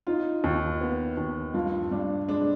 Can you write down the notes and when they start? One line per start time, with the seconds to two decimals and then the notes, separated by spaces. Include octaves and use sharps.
0.07 D#4 F4
0.44 D#2
0.81 B3
1.17 D#2
1.54 G2 F4
1.91 G2 D4
2.29 G#3 D4